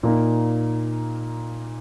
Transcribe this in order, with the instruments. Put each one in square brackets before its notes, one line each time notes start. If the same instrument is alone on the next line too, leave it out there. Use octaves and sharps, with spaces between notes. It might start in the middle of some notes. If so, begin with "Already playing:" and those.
[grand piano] A#2 A#3 D#4